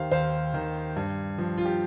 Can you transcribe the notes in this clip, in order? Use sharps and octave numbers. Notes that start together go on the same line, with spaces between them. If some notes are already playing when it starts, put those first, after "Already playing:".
Already playing: D#2 D#3 G4 C5 F5
D#2 C5 F5
D#3
G2
F3
F4
G4